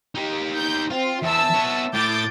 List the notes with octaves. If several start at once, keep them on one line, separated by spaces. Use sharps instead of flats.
D#4 G4
G6
C4 F4
E2 E5 A5 E6
B3 C#5
A2 D6 G6 A6